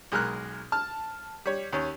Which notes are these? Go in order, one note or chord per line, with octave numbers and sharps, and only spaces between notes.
B1 G#3 A#4 F6 F#6
A5 F6
G3 C#5
D#2 C#4